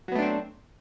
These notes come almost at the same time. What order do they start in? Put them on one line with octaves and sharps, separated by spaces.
F#3 B3 A3 D4 C4